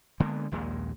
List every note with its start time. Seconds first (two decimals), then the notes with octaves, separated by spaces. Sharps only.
0.20 D3 G#3 A#3 B3
0.52 A#1 D#2 A#2 G#3